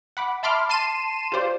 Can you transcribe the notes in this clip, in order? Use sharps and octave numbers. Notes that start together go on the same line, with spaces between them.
F#5 B5 D6
E5 A5 B5 C6 D6 F6
A5 C6 C7 D#7 E7
F4 G4 C5 D5